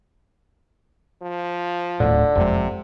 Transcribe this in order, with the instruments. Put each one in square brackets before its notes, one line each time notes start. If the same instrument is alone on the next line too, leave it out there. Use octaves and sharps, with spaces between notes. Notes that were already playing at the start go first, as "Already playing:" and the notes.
[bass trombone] F3
[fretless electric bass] D1 A2 [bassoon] D3
[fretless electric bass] F#1 F2 G#3 [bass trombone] C3